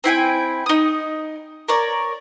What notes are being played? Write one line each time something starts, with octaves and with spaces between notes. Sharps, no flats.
C4 E4 G5 G#5
D#4 D#6
A#4 C#5 D5